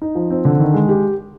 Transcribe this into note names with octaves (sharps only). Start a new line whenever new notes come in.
D#4
F3
C4
D3
D#3
G#3
G4